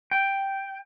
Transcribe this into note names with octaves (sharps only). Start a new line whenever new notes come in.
G5